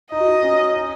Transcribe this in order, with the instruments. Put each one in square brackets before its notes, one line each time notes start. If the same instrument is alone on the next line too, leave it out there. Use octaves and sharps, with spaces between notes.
[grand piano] D#4 [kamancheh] D#5
[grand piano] F#4
D#4
C#4
D#4